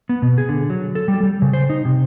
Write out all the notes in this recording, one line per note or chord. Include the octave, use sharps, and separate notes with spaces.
B3
B2
G#4
D3
F#3
A4
G3
G3
C#3
C5
D#4
C3